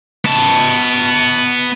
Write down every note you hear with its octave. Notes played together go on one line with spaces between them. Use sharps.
B3 A5